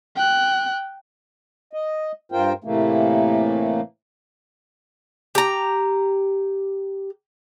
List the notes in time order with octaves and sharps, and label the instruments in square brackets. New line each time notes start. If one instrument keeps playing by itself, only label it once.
[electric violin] G5 F#6
[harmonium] D#5
G2 F4 A#4 C5 G5
A2 C3 E3 A3 A#3
[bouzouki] G4 A#5